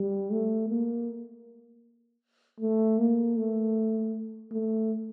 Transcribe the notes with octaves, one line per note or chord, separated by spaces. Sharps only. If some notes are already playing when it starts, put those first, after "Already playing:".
Already playing: G3
A3
A#3
A3
A#3
A3
A3